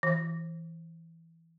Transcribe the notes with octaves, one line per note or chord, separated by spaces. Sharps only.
E3